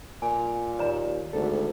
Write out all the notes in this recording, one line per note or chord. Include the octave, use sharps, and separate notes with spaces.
A#2 G#5
D#2 D5 A#5
G#1 D2 A4